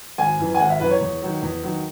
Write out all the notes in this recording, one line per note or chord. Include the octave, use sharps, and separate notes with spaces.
G#1 G#5
F#2 E3
G#5
G#1 F#5
E5
F#2 E3 B4
C#5
E2
D#3 F#3
E2
D#3 F#3